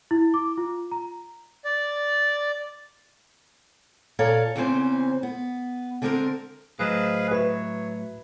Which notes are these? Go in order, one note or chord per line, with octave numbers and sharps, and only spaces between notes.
E4
D6
F4
A#5
D5
A#2 A4 C#5 D5 F5 A#5
E2 C#3 E3 C4 C#4 C5
B3
D3 G#3 C4 C#4 A#4 C5
A2 F#3 G#4 B4 C5 D#5 F5
F#4 B4 C#5 E5